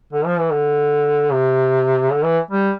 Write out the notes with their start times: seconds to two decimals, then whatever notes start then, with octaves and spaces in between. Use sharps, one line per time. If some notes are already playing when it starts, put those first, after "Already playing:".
0.13 D3
0.26 F3
0.39 E3
0.52 D3
1.32 C3
2.11 D3
2.25 E3
2.51 G3